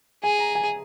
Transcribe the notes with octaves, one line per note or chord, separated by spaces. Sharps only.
G#4 G#5
A#5
G#5